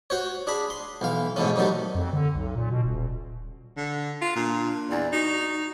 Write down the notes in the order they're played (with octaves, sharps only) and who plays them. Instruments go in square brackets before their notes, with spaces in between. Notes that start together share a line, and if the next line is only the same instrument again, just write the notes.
[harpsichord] F#4 C5 C#5
D4 G#4 B5
C6
B1 E3 F5
G#2 B2 E3 A3 C#4
C3 D#3 F#3 G3 A3
[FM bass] F2
D3
B1
A#2
B2
D#1
[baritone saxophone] D3
F4
[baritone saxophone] A#2 [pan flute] D4
[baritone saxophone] E2 [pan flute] D5
[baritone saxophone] D#4 [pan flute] F#4